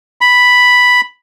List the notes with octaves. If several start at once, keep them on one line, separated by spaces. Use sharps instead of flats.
B5